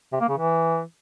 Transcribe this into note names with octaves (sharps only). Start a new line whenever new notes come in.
C3
A#3
C#3
E3